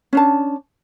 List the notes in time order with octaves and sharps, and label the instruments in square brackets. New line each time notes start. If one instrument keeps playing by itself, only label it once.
[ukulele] C#4 D4 A5